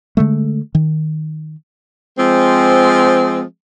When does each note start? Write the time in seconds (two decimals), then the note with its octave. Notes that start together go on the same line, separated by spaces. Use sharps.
0.17 D3 G#3 A3
0.75 D#3
2.17 F3 G#3 C4